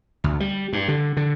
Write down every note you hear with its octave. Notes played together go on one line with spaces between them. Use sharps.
D2
G3
G2
D3
D3